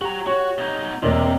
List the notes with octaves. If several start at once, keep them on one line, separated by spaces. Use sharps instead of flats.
F#4 G4 A#5
F#4 C#5
B2 D#4
E1 E2 C3 A#3 D5 D#5